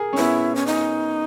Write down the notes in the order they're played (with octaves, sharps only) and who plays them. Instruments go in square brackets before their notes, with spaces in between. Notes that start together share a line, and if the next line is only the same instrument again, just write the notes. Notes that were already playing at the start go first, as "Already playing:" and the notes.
Already playing: [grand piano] G#4 A#4
C#4
[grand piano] B3 [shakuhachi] E4
[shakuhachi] C#4
D#4